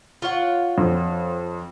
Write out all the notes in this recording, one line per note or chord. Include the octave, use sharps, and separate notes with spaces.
F4 C#5 F#5
F2